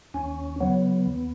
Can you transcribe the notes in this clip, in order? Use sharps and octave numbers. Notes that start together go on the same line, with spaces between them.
D#2 C#4
C#3 F#3 B3
D#2